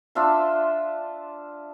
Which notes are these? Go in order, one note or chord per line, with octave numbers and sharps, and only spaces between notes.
D4 F4 E5 C6